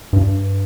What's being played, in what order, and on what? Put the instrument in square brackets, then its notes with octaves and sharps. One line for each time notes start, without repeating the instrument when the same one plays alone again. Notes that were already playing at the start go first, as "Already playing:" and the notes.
[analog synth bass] G2